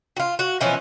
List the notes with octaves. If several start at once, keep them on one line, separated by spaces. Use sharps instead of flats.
F4 F#4
F#4
B2 E3 F3 C#4